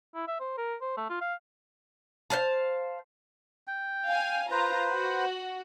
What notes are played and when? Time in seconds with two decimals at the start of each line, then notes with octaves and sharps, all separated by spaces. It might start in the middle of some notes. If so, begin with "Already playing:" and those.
0.15 E4
0.28 E5
0.40 C5
0.58 A#4
0.81 C5
0.97 A3
1.10 F4
1.21 F5
2.30 C5 D5 F5 A5
3.67 G5
4.06 F5 G#5
4.51 F4 B4 C5 A#5
4.91 F#4